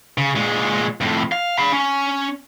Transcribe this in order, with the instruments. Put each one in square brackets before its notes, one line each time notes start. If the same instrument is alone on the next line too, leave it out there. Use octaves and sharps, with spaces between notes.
[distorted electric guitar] C#3
A#2 G#3
F2 A2
F5
F5 B5
C#4